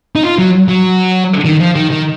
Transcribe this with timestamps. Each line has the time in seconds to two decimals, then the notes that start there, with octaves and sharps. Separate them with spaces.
0.15 D#4
0.23 F4
0.38 F#3
0.68 F#3
1.45 D#3
1.59 F3
1.75 D#3
1.91 D#3